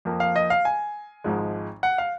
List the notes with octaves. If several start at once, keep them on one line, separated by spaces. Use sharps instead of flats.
F2 F3 A#3
F5
D#5
F5
G#5
G#1 G#2 F3 G#3
F#5
F5